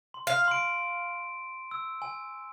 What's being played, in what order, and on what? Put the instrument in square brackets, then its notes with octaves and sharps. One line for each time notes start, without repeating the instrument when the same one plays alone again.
[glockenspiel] C6
[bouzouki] F5
[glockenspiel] C6 D7
E6
G#5